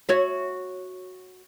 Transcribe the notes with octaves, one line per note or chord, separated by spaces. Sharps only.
F#4 C#5 E5